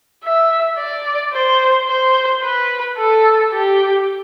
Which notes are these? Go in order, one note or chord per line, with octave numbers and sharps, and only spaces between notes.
E5
D5
C5
C5
B4
A4
G4